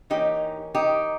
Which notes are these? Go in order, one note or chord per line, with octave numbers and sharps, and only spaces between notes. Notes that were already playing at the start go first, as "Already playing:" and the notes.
E3 A#3 C#4 D#4 G4
D#4 G4